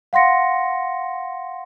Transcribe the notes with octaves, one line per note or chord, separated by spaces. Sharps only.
F5 F#5 C6 A#6 C#7